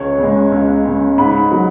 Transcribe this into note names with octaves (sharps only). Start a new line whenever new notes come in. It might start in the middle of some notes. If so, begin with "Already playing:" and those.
Already playing: C#2 C#5
C#3 G#3
C#2
C#3 G#3
G#2 B5
F#3